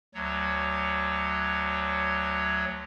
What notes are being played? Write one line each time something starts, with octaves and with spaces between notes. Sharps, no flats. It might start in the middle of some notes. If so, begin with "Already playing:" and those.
D2 F#3 C#5